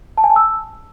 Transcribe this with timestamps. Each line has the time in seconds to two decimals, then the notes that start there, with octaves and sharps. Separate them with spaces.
0.18 A5
0.24 G#5
0.30 A5
0.36 E6